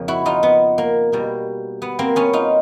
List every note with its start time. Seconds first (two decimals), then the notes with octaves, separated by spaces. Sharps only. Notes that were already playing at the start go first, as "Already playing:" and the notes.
Already playing: F2 C#3 F3 A#3
0.08 E4 F#4
0.26 D#4 F4
0.43 B3
0.78 A#3
1.12 B2 G3 A#3
1.82 B3
1.99 A#3 C4
2.16 B3 C#4
2.33 D#4 F4